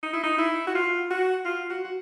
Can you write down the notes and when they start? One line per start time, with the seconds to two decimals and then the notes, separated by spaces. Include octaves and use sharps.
0.03 D#4
0.13 E4
0.23 D#4
0.38 E4
0.67 F#4
0.75 F4
1.10 F#4
1.46 F4
1.70 F#4
1.84 F#4